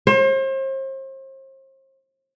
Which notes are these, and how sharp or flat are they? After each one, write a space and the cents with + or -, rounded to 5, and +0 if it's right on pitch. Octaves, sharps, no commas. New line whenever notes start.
C5 +40